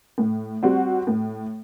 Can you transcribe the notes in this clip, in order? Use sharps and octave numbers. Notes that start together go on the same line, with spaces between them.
A2
G3 C4 F#4
A2